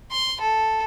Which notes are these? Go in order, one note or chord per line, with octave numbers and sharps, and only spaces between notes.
C6
A4